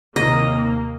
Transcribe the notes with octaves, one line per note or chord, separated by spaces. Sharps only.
D#2 C3 A#3 D#5